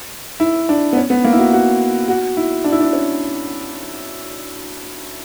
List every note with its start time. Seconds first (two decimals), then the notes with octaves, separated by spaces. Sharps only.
0.40 E4
0.69 D4
0.93 B3
0.97 C#4
1.10 B3
1.24 A#3
1.32 E4
1.38 F#4
1.53 F#4
2.08 F#4
2.37 E4
2.64 D4
2.72 E4
2.81 D4
2.93 C#4